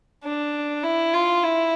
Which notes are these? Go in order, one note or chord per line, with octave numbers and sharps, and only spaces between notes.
D4
E4
F4
E4